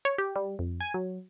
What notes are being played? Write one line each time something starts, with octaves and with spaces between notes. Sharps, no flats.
C#5
G4
G3
F2
G#5
F#3